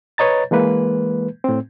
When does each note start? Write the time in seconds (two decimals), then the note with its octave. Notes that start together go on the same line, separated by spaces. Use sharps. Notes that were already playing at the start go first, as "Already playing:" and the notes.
0.18 B4 C#5 D#5 A#5 A6
0.51 E3 G#3 A#3 B4
1.44 A2 C4